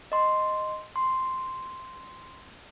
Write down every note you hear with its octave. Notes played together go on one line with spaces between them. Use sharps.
D#5 C6
C6